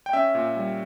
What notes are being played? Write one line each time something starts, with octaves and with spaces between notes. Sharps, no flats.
G5
C#4 E5
A#2
G3